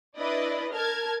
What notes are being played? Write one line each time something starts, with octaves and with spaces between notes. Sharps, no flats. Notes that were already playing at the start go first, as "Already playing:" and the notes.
D4 E4 B4 D5 D#5
A#4 A5 F6 G#6